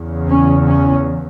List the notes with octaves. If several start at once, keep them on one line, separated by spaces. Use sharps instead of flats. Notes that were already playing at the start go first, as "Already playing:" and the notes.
Already playing: E2 C#3
C#4
C#4